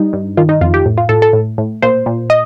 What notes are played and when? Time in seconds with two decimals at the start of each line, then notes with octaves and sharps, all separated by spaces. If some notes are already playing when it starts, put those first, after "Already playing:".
Already playing: G3 D#4
0.13 G2
0.37 D#3 F4
0.49 D#4
0.61 F2 F4
0.74 G4
0.86 A2
0.98 F4
1.09 A2 A4
1.22 A4
1.33 A2
1.58 A2
1.82 A#2 C5
2.06 A#2
2.30 D#5